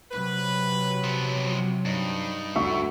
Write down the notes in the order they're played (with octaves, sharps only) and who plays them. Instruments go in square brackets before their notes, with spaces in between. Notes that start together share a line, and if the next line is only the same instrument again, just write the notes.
[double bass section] C3 F#3 [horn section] B4
[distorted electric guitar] F3 B3
[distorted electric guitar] G2 [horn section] D#4
[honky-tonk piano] D2 E5 C#6